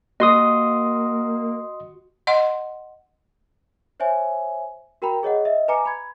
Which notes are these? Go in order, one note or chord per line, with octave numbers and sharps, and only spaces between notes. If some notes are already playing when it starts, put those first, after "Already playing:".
A#3 F#4 D#5 C6 D#6
D#5 F#5 C6
C5 C#5 E5 G#5
F#4 A#4 G5 A#5 B5
G#4 C#5 D#5 F#5
D#5 E5
B4 G#5 A#5 D6 C#7
B5 G#6